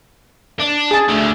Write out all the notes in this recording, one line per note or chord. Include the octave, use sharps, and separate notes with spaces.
D4
G#4 A5
D2 D3